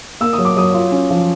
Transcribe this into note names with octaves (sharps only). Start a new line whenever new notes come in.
A#3 E6
F#3 D#6
D6
F#3 D#6
F4
C#4
F3